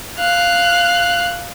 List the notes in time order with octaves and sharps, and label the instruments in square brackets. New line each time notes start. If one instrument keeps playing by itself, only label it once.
[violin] F5 F#6